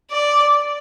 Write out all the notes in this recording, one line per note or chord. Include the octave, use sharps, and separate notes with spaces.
D5